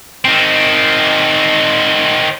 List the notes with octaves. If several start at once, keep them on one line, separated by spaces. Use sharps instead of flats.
D#3 C4